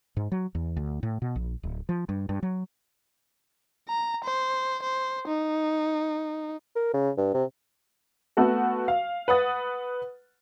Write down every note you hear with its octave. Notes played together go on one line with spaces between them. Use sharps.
G#2
F#3
E2
D2
A2
B2
A#1
D1
F3
G2
G2
F#3
A#5
C5
C5
D#4
A#4
C#3
G2
C3
A3 B3 F#4 A4
F5
B4 F#5 D#6 A6